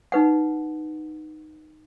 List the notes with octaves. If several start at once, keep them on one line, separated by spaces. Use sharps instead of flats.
D#4 B4 F#5